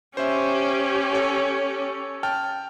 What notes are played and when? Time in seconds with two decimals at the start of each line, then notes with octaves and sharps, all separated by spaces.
0.17 C#4 G4 C5 E5
1.13 A4 C#5
2.23 G5 A5 F6